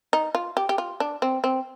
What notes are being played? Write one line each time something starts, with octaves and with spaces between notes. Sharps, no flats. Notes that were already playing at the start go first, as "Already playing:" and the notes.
D#4
F4
G4
G4
F4
D4
C4
C4